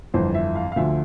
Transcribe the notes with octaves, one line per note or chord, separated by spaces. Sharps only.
G1 F2 E3 C5
E5
F5
F5
D2 D3 F3 E5